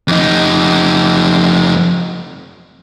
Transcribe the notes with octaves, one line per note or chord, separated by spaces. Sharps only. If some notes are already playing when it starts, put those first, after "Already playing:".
F2 D#4